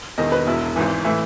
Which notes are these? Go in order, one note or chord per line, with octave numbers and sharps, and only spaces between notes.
E1 E2 D#3 D#5
B4
E1 E2 B2 E4
G#1 G#2 E3
A2 E3 E4